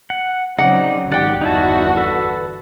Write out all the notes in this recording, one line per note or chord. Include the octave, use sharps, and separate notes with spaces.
F#5
C#3 F#3 C4 D#4 D5 F#5
G#1 D#3 G4 D5 F#5 G5
G1 E2 D#4 E4 F#4 A5
A4 B4